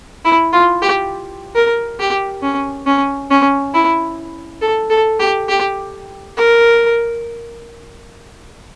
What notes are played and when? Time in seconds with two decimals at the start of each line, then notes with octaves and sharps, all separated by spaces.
0.25 E4
0.53 F4
0.82 G4
1.56 A#4
1.99 G4
2.43 C#4
2.86 C#4
3.31 C#4
3.74 E4
4.62 A4
4.90 A4
5.20 G4
5.49 G4
6.37 A#4